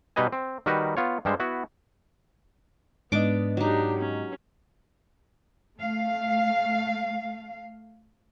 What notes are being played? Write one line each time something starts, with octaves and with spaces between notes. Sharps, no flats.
B2 G3 D#4 B4 D#5 G#5
C4
D#3 G3 D#4 F#4 A#4 B4
B3 F4 C#5
G2 G3 G#3 C5
B3 E4 F#4
G#2 B3 D4 D#5 D6
F#3 D4 D#4 G4
C#4
A3 F5